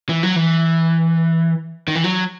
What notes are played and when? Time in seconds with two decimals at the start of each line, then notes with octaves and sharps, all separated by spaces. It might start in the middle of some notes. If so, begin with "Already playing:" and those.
0.09 E3
0.23 F#3
0.36 E3
1.88 D#3
1.95 E3
2.04 F#3